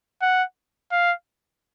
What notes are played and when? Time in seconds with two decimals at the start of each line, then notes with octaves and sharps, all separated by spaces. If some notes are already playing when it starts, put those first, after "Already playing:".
0.22 F#5
0.91 F5